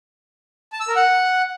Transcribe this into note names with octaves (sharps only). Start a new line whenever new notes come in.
A5
E6
A#4
F#5